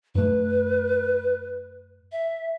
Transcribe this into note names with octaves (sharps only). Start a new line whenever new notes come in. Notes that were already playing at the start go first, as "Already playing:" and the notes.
F#2 A3 B4
E5